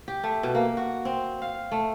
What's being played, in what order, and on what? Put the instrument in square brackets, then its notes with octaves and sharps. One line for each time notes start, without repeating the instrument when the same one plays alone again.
[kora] G4
A3
B2
A#3
F#4
C4
F5
A3